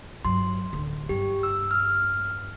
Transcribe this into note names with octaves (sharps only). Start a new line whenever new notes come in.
G2 F#3 C6
D1 D3
G2 G3 G4
E6
F6